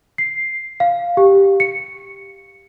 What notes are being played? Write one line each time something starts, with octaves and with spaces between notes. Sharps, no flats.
C7
F5
G4
C#7